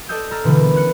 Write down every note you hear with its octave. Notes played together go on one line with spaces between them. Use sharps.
A4 D5 D#5 E6 G6
A#5 E6 F6 A6 A#6
B2 D3 E3 G3
B3 A#4
C#4 F#6 C#7